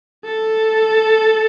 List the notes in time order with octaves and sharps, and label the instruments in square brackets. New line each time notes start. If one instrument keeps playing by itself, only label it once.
[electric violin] A4